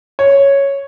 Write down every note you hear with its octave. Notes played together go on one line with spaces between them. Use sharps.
C#5